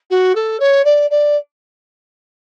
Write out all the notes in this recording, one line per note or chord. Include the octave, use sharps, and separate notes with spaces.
F#4
A4
C#5
D5
D5